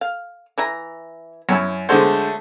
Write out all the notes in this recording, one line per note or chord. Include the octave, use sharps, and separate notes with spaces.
F5
E3 E4 A#5
F#2 F#3 C#4 E4
D3 F#3 G#3 A3 C5